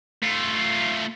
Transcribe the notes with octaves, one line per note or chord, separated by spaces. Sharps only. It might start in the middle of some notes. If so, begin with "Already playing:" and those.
A3 F4